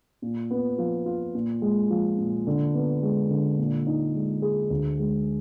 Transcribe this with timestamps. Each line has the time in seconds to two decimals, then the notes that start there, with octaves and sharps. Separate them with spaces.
0.22 A#2
0.51 B3
0.78 F3
1.06 F4
1.35 A#2
1.62 G#3
1.90 F3
2.18 A#2
2.47 D3
2.74 B3
3.03 G#3
3.30 D3
3.58 A#2
3.87 D#4
4.15 G#3
4.42 G#4
4.70 D2
4.99 G#3